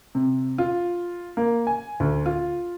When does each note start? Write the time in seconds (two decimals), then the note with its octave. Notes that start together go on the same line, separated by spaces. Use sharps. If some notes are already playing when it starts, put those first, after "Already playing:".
0.15 C3
0.58 F4
1.37 A#3
1.67 G#5
2.00 D2
2.26 F4